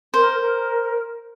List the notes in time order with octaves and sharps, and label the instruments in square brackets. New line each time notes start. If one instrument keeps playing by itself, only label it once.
[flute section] A#4 [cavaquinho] C5
[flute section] A#4